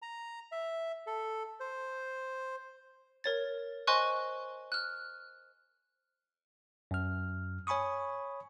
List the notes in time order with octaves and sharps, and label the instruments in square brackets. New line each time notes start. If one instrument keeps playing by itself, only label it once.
[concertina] A#5
E5
A4
C5
[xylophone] A#4 C#5 A6
C5 D#5 G#5 C6 C#6 F#6
F6 F#6
[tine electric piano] F#2 F6
C#5 G#5 B5 C#6 D#6